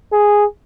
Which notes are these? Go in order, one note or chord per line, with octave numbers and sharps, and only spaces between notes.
G#4